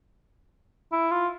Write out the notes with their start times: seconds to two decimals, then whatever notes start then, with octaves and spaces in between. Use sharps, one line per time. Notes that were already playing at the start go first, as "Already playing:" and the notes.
0.92 E4
1.11 F4